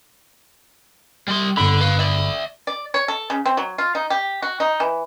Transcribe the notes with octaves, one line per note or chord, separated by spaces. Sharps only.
G3 C6
G1 D3 B5
B4 F5
D5 E5
D5
C#5
A4
C#3
C4
F#3
F4
D#4
G4
F#4
D#4
E3